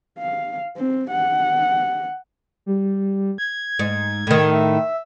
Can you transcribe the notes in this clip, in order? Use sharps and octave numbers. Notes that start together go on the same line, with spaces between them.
F5
C4
F#5
G3
G#6
G#2
A2 D#3
E5